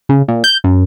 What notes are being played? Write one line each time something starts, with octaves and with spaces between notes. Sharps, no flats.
C#3
A#2
G6
F#2